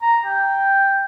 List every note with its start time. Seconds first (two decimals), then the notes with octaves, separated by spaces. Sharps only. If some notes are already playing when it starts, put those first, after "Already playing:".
0.02 A#5
0.25 G5